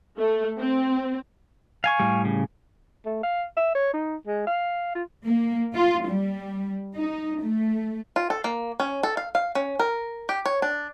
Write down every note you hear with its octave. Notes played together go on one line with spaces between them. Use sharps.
A3
C4
F5 G#5 C#6
A2 G3
C#3
A3
F5
E5
C#5
D#4
G#3
F5
F4
A#3
F4
G3
D#4
A3
F4
A4
A#3
C#4
A4
F5
F5
C#4
A#4
G4
C#5
D4